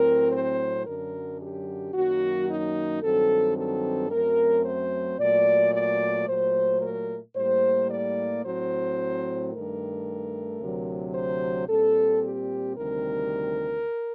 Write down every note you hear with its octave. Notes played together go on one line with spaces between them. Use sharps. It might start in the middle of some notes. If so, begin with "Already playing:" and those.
Already playing: A2 F#3 C4 A#4
C5
F#2 D3 F#3 A#4
G4
F#2 D#3 F#3 A#3 F#4
D#4
G2 D#3 F#3 C4 A4
A4
F#2 F#3 A3 C4 A#4
C5
A#2 F#3 A3 D5
D5
A#2 F#3 A3 C5
A#4
A2 G3 A#3 C5
D5
A2 F#3 C4 C5
G2 D#3 A3 A#4
D2 C3 F#3
C5
A#2 G3 C4 A4
G4
D2 C3 D#3 G3 C4 A#4